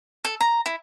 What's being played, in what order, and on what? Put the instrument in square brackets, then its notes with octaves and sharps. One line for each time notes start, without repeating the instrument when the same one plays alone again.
[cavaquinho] A4
A#5
E4